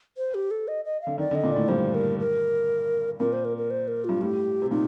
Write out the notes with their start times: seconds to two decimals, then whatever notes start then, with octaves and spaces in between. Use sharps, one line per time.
0.17 C5
0.34 G4
0.51 A4
0.68 D#5
0.85 D#5
1.02 F5
1.07 D3
1.18 D#3 D5
1.31 D3
1.35 D#5
1.44 A#2
1.52 A2 D5
1.68 G2 C5
1.95 A#4
2.19 A#4
3.20 A#2 A#4
3.33 C5
3.45 A#4
3.57 A#4
3.70 C5
3.88 A#4
4.04 G2 F4
4.21 A2 G4
4.62 C3
4.71 A#2 D#4